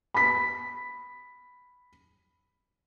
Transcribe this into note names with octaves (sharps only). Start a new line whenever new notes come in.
B5 B6